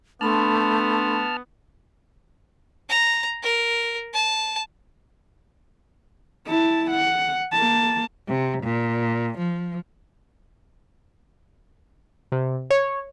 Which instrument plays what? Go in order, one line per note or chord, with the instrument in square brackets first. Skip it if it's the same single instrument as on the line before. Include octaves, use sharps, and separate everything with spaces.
[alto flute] A3 [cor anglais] B3 [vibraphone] D4 B5 C6 [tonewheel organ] A5 F6
[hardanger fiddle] A#5
A#4
A5
[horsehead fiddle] E4 A5
F#5
A#3 A5
[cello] C3
A#2
F3
[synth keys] C3
C#5